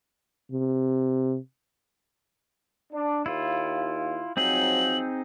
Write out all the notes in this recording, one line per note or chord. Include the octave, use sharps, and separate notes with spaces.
C3
D4
D#2 E4 F4
F3 F#3 C4 D#4 G#4 F#7